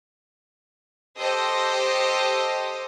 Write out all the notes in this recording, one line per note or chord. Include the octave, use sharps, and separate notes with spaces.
G4 A4 C5 D#5